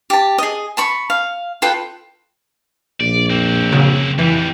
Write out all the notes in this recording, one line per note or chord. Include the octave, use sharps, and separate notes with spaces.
G4 A5
G#4 D#5
A5 B5 C#6
F5
F4 A4 B4 G5
A#1 D5
A#3 C4
C#3 F#3
F2 E3 G3